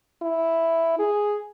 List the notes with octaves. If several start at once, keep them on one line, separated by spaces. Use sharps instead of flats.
E4
G#4